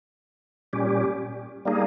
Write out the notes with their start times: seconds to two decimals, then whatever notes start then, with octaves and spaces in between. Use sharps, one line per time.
0.73 A#2 G3 C#4 G4
1.65 G3 A#3 D#4 G#4